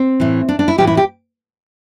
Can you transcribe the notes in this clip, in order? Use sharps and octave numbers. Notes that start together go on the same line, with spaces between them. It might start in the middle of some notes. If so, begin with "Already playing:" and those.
Already playing: C4
A2 E3
D4
D4
E4
A2 E3 G4
E4
G4